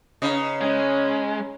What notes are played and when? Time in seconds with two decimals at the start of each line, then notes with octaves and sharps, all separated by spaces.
0.22 C#3 D#4 B4 D#5
0.61 G#3 C#4